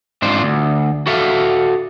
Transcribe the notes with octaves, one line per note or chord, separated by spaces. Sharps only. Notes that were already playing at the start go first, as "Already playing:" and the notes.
G#2 C4 D4 F4 C5
D2
F#4 A4 E5 F5